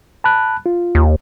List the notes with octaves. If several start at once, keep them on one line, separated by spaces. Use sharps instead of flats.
A5 B5 F#6
F4
D#2